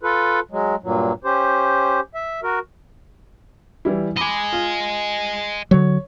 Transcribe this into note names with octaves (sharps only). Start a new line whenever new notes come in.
F4 A4 B4
F#3 G#3
G2 A#2 F#3
C#4 G4 C5
E5
F#4 A#4
E3 G3 E4
D#5 G#5 B5 D6
F4
D3 F#3 C#5